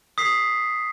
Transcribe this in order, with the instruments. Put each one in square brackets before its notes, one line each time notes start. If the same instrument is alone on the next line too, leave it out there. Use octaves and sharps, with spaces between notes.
[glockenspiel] D#6 B6 C7